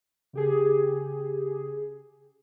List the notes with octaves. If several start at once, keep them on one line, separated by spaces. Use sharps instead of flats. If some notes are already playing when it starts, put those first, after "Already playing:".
C#3 G4 G#4